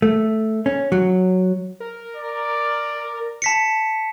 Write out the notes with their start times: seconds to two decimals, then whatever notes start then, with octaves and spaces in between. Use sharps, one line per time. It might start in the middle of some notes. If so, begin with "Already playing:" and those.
0.02 A3
0.66 C#4
0.92 F#3
1.80 A#4
2.16 D5
3.42 A5 B6 C#7